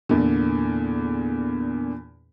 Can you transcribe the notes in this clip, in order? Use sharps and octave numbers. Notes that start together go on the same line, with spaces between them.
E2 A#2 D3